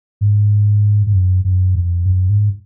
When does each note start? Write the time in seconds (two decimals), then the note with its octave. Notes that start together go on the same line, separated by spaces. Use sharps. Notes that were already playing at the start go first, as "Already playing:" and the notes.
0.21 G#2
1.07 G#2
1.13 F#2
1.44 F#2
1.75 F2
2.06 F#2
2.29 G#2